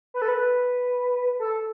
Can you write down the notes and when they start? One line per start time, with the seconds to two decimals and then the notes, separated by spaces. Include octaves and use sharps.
0.14 B4
0.22 A4
0.29 B4
1.40 A4